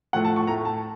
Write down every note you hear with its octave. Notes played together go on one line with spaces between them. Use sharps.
A2 F3 A3 F#5
A5
C#6
A2 A3 A#5
A5